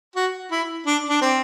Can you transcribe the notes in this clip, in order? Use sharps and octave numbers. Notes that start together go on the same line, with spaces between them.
F#4
E4
D4
D4
C4